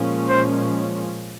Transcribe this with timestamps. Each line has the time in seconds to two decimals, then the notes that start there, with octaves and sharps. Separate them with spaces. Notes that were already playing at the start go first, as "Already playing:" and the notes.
Already playing: A#2 F3 G#3 C#4
0.29 C5